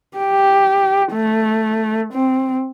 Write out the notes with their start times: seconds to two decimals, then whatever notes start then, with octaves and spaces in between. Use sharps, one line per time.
0.17 G4
1.13 A3
2.13 C4